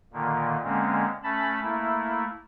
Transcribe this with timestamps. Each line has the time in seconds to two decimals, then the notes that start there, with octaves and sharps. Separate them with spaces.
0.13 A#2 D3 D#3 A#3
0.64 D3 G#3 A#3 C4 C#4
1.24 A3 C#4 A5 B5
1.63 A3 A#3 E4